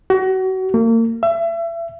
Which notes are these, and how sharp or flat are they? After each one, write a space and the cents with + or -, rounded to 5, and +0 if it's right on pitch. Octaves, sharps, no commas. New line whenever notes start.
F#4 +30
A#3 -35
E5 +30